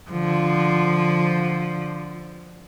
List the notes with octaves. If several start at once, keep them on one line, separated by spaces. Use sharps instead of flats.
D3 F3